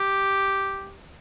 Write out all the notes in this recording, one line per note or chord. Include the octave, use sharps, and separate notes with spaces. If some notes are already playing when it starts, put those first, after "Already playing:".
Already playing: G4